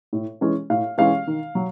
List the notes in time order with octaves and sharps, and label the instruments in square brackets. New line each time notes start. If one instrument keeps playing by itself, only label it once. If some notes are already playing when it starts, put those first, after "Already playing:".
[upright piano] A2
E3 G#3 C#4
A2 F5
E3 G#3 C#4 F5
D#3
F#3